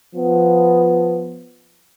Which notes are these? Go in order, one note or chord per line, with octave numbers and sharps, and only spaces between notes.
F3 B3